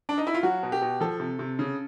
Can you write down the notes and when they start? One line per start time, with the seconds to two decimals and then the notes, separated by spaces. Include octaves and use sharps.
0.09 D4
0.18 D#4
0.27 E4
0.34 F4
0.43 F#3 F#4
0.63 B2
0.72 G4
0.82 B2
1.01 F3 A4
1.20 C3
1.39 C3
1.59 C#3